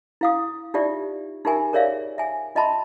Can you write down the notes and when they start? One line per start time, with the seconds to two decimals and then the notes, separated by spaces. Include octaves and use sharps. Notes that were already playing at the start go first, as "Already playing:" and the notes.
0.21 E4 F5 D#6
0.74 D#4 F4 G4 D5 E5
1.45 D#4 F4 G4 A#4 E5 G#5
1.73 G#4 A#4 C#5 D5 E5 F5
2.18 E5 G#5
2.55 F4 D#5 E5 A5 B5 C6